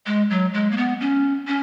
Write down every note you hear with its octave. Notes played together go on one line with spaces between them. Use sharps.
G#3
F#3
G#3
A#3
B3
C#4
C#4